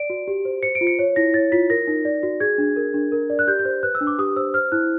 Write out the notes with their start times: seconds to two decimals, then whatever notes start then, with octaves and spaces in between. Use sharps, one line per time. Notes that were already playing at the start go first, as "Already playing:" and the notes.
Already playing: D5 D7
0.10 F#4
0.28 G4
0.45 C5
0.63 C5 C#7
0.75 D7
0.81 F4
0.87 C#7
0.99 C#5
1.16 E4 A#6
1.34 C#5 A6
1.52 F4 B6
1.70 A#4 A#6
1.87 D#4
2.05 D5
2.23 F#4
2.40 G#4 G#6
2.58 D4
2.76 A#4
2.94 D4
3.12 A#4
3.30 D5
3.39 F#6
3.47 G4 G6
3.59 G6
3.65 C5
3.83 B4 F#6
3.95 E6
4.01 D4
4.07 D6
4.18 G4 D#6
4.36 C5 E6
4.54 C5 F6
4.72 E4 F#6